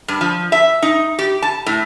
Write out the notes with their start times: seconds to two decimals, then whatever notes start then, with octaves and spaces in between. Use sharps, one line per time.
0.08 G2
0.21 F3
0.52 E5
0.82 D#4
1.19 G4
1.42 A5
1.66 A2